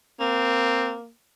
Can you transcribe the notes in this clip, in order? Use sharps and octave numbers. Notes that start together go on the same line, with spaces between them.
A#3 C4